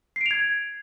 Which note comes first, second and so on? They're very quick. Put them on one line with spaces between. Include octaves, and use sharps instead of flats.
C7 D7 F7 G#6